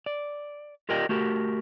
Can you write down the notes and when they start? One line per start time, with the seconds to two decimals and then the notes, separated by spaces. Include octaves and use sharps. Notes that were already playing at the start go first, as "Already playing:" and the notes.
0.06 D5
0.89 F4 G4 A#4 D5 D#5 G5
1.09 A3 F#4 G4 A#4